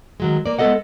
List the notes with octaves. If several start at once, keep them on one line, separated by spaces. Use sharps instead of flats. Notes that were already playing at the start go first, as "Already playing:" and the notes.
D#3 F#3 G#3
A#3 D5
G#3 B3 A4 D#5 F#5